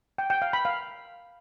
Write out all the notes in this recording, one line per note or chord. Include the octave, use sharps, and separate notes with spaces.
G5
G5
F5
B5
F5